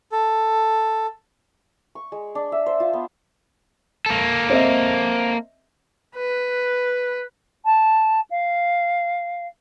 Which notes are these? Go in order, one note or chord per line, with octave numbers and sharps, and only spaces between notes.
A4
C#6
G#3
D4
E5
C5
F4
B3
A#3 A4
C4 D#5 E5
B4
A5
F5